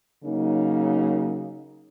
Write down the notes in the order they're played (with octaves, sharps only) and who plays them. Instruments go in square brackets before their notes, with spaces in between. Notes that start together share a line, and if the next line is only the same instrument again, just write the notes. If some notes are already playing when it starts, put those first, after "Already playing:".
[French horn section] C#3 F#3 A#3 D#4